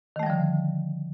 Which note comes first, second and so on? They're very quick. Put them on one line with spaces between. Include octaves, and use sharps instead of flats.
D#3 A3 G3 F3 D3